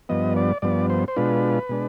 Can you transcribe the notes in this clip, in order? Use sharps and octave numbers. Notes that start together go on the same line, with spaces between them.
G2 F3 B3 D#5
D5
G2 F3 B3 D5
C5
C5
B2 G#3 D4 F4 B4
B2 G#3 D4